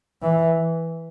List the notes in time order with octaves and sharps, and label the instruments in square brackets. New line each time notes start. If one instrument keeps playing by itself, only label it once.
[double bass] E3